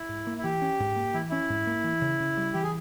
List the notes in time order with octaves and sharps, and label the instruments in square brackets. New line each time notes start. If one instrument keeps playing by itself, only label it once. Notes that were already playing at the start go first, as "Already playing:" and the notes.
Already playing: [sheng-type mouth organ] E4
[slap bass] G#2
A#3
[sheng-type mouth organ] E4
[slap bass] E3 [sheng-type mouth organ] G4
[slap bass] C#4
G#2
A#3
[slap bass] E3 [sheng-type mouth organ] E4
[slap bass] C#4 [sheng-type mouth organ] E4
[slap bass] G#2
A#3
E3
C#3
C#3
G3
[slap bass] E3 [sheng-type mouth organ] G4
[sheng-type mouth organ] G#4